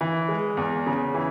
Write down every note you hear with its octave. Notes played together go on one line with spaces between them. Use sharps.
E3
G#3
E2
C#3
E3